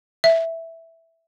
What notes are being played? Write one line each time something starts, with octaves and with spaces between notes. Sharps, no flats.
E5